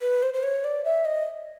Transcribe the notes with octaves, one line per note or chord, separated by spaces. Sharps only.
B4
C5
C5
C#5
D5
E5
D#5